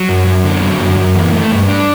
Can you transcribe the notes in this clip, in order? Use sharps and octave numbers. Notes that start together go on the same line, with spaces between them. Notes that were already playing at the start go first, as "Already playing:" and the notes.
Already playing: F#3
F#2
F#2
D3
F#3
F#2
F#2
E3
A3
G2
D4